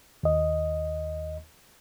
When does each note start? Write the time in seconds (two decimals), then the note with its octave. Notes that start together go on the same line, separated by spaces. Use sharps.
0.23 D#2 D#5